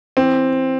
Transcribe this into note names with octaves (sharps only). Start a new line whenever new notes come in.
E3 C4